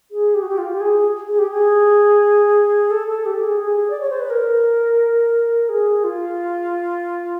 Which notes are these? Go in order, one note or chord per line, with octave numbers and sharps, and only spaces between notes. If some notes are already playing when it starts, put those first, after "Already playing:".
G#4
G4
F#4
G4
F4
G4
G#4
G#4
G4
G#4
A4
A4
G4
G#4
G#4
D5
C#5
C5
B4
A#4
G#4
F4